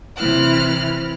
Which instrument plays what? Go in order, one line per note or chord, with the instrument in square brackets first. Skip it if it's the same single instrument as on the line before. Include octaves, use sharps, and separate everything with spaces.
[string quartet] C3 E3 E4 F6 F#6